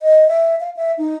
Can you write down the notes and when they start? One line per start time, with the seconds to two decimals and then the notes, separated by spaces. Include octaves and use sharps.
0.02 D#5
0.28 E5
0.60 F5
0.76 E5
0.98 D#4